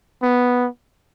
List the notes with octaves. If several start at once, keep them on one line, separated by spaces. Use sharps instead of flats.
B3